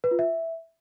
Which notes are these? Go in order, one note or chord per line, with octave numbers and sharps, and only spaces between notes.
B4
F4
E5